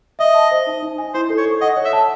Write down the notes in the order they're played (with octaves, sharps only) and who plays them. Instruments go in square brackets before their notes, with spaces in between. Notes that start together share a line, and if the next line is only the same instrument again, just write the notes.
[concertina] D#5 [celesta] E5
[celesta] A5
C5
D#4
D#4
G#5
[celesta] E4 [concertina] C5
[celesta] A4
[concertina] C#5
[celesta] A4
[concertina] D#5 [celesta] F#5
[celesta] C#5
[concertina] E5
[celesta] A5